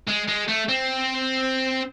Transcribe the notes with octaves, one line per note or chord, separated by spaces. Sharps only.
G#3
G#3
A3
C4